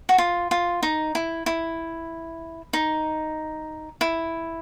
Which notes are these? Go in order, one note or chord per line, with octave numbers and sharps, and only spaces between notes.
F#4
F4
F4
D#4
E4
E4
D#4
E4